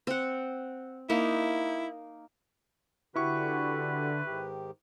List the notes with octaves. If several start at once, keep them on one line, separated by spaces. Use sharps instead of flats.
C4 F#5
A#3 D#4 E4
D3 E4 F#4 G4 B4 C#6
G#2 D#3 G4